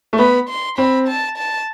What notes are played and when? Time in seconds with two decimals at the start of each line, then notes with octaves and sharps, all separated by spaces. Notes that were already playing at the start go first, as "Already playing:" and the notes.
0.13 A3
0.19 B3 B5
0.48 C6
0.78 C4 B5
1.08 A5
1.37 A5